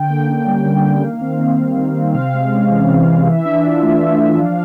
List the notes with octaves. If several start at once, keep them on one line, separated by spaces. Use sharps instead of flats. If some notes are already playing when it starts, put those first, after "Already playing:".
Already playing: D3 G5
A#3
C#4
G3
D3
A#3
D#3 F5
C4
D#3
G3
D#3
C4
C3 F5
G#3
C#4
E3
C3
G#3
E3 E5
D4
F4
A3
E3
D4
F3 F5